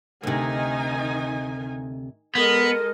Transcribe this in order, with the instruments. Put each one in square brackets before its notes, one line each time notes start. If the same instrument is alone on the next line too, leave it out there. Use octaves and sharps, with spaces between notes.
[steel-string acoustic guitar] D2 C3 [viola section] D#3 D#4 G#5
[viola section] G#3 A4 D#5 [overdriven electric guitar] B3 [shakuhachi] A#4